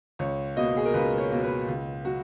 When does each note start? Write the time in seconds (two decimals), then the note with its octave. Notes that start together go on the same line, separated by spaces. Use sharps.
0.19 C#2 C#5
0.57 B2 A#3 D#5
0.77 G#4
0.86 A#4
0.94 C#2 B4
1.18 C#5
1.31 B2 A#3
1.44 B4
1.68 C#2
2.05 F#3 F#4